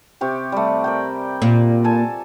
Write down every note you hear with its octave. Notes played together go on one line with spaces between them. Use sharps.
C3 G4 C#6
G3 A3
A#4 D5 G5
A#2
A4 G#5 A5